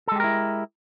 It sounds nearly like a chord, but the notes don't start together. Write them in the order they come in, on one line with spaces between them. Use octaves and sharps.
A4 G#3 G4 A#4 E4